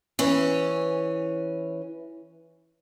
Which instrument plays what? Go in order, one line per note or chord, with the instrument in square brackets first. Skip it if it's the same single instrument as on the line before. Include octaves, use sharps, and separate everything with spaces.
[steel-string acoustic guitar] E3 C#4